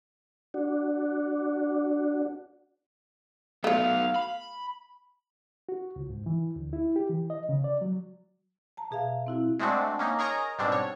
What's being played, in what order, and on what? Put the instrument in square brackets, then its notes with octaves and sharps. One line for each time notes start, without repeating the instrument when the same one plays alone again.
[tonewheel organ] D4 F#4
[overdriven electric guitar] F#3 B3 [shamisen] A3 F4 [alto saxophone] F5
[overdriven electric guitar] B5
[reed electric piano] F#4
C#2
G#2
E3
D2
E4
G4
E3
D#5
C#3
D5
F#3
[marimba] A5 A#5
B2 G#4 E5 F5
C4 E4 F#4
[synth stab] G#3 A3 C4 D4 F#4
A#3 C#4 D#4
G#4 A#4 C#5 D#5 A#5
G#2 B2 G3 C4 D4
C#5